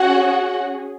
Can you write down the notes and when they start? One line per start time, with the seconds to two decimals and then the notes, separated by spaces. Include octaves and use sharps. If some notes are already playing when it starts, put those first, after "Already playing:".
Already playing: C#4 F#4 G#4 F#5